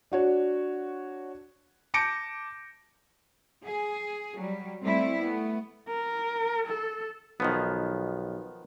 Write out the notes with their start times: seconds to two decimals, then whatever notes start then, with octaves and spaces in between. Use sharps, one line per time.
0.12 D4 F#4 C#5
1.94 A5 D6 G6 A#6 C#7 D7
3.63 G#4
4.37 F#3 G3
4.83 G3 A3 C4 E4
5.22 A3 B3
5.89 A#4
6.66 A4
7.40 B1 D#3 F3 B3